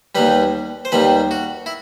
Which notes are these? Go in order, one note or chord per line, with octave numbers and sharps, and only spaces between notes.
D#2 D#3 G3 B4
C5
D#2 D#3 G3 B4
F#4
E4